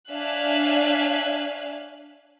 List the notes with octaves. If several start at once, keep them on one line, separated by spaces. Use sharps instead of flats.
D4 C#5 E5 F5 G#5 F#6